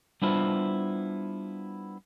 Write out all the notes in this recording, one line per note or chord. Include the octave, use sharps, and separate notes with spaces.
G3 B3 D4 E4 F4 C5